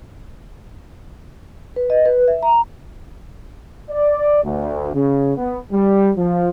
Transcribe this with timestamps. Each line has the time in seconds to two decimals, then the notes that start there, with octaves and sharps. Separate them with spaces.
1.76 B4
1.90 D#5
2.05 B4
2.28 E5
2.43 A#5
3.90 D5
4.44 D2
4.95 C#3
5.37 B3
5.72 G3
6.17 F3